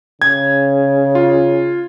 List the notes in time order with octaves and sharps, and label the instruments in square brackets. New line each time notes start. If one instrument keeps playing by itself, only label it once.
[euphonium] C#3 [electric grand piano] G#6
[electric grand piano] F4